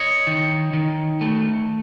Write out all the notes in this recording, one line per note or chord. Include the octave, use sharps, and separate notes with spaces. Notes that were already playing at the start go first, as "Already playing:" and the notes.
Already playing: C#5 D#5
D#3
D#3
A3